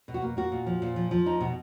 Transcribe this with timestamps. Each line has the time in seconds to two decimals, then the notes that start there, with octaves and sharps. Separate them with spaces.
0.08 B2
0.14 F#4
0.22 A#3
0.37 A#3 F#4
0.52 A#2
0.66 F3
0.82 A#2
0.96 F3
1.11 F3
1.26 D#4
1.41 B2